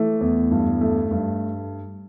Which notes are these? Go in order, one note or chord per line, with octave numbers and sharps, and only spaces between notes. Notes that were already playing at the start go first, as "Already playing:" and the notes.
Already playing: E3 A3
E2
G2
A3
G2